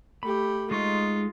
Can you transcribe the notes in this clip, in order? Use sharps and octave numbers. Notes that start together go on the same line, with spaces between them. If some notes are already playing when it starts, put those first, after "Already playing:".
A3 G4 B5
G#3 D#4 F4 C#6